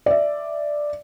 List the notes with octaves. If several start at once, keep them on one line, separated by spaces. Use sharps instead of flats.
D5 E5